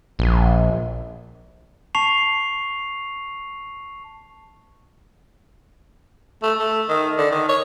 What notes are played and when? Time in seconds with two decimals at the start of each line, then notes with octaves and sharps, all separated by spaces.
0.19 A#1
1.95 A5 C#6 C7 F7
6.43 A3
6.59 A3
6.89 D#3
7.18 D3
7.31 D#3
7.49 C#5